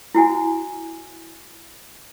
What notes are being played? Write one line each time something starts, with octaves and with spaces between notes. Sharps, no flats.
E4 F#4 G#5